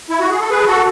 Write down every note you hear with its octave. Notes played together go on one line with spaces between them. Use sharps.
E4
F#4
G#4
A4
G#4 B4
F#4 A4